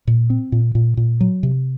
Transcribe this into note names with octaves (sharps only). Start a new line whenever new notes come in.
A#2
C4
A#2
A#2
A#2
F#3
C3